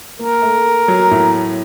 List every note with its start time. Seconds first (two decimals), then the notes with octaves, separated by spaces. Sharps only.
0.19 A#3 A#4
0.42 A3
0.88 F#3
1.11 A2